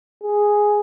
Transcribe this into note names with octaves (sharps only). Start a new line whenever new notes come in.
G#4